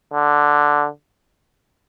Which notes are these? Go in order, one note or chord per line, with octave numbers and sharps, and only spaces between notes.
D3